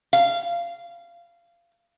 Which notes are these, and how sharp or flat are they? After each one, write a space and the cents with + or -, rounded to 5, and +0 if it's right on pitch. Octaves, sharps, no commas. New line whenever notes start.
F5 -20